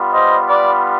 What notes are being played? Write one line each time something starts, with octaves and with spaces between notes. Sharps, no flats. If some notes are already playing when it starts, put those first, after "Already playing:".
Already playing: G3 B3 F4
C5 D#5
B4 D5